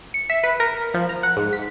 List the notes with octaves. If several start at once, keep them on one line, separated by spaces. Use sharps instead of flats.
C#7
E5
B4
A#4
F3
A#5
F#5
G#2
B6